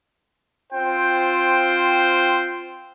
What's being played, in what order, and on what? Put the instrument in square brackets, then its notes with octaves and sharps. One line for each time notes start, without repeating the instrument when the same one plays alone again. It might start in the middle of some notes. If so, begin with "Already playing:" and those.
[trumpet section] C4 F4 C5 G5